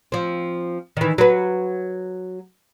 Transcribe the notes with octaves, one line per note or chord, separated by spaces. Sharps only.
F3 C4
D#3 E3
F#3 B4